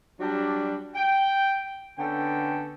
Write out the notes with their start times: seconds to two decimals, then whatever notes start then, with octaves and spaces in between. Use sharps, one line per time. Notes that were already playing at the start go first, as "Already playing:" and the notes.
0.20 F#3 G3 D4
0.95 G5
1.98 D3 B3 C#4 A4 G5